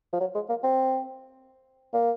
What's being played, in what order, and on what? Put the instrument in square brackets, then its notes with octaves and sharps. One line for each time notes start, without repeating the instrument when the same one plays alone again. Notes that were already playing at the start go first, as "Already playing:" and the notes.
[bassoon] F3
F#3
G#3
A#3
C4
A#3